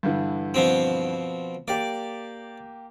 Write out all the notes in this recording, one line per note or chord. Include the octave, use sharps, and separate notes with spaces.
G2 D3 E3
B2 F3 C4
A#3 G4 D5